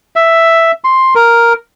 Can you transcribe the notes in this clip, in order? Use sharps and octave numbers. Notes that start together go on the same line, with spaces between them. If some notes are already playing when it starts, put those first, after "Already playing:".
E5
C6
A#4